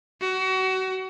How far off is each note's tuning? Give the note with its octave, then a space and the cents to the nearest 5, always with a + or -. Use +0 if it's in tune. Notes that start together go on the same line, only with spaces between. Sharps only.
F#4 +30